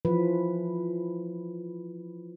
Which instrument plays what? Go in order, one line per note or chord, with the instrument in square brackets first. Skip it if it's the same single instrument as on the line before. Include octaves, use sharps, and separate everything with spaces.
[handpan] E3 F3 B4